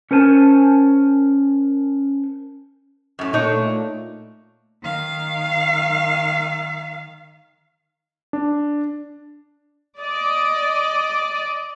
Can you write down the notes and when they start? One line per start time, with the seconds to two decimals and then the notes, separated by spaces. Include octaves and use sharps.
0.11 C#4 A#4 C5 G#5 A5
3.19 F#2 A2
3.33 A#2 A3 D4 D#4 C#5
4.83 D#3 F5
8.33 D4
9.99 D5 D#5